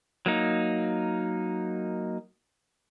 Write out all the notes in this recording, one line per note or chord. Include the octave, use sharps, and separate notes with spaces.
F#3 A#3 D#4